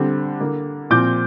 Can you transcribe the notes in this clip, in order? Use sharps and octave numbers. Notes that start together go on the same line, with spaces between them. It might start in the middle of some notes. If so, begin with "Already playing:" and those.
Already playing: D3 G3 C4
D3 A#3
A#2 F3 C4 D6 G6